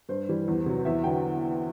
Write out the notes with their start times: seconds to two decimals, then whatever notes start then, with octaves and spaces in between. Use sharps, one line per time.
0.09 G2 C5
0.29 E3 G3
0.48 E2
0.66 C3 F#3
0.85 E2 E5
1.04 D3 F#3 G5